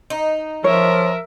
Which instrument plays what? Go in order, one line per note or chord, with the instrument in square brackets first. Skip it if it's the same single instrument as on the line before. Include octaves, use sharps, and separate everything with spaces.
[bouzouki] D#4
[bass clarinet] F3 [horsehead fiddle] A#4 E5 [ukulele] C#5